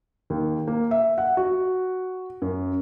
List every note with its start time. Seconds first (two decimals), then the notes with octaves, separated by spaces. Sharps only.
0.30 D#2
0.67 A#3
0.91 E5
1.18 F#5
1.37 F#4
2.42 F#2